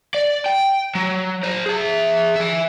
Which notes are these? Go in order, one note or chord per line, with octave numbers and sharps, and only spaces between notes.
D5
G5
F#3
A#4 C5
G#4 E5
E5 G#5